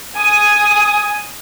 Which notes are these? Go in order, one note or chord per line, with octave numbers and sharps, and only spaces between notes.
G#5 D#6